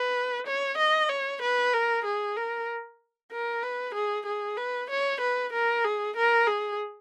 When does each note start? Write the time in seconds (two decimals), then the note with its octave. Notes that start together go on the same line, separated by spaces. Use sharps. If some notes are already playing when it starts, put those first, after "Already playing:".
Already playing: B4
0.47 C#5
0.78 D#5
1.09 C#5
1.42 B4
1.73 A#4
2.05 G#4
2.36 A#4
3.32 A#4
3.63 B4
3.95 G#4
4.26 G#4
4.57 B4
4.90 C#5
5.21 B4
5.53 A#4
5.84 G#4
6.17 A#4
6.47 G#4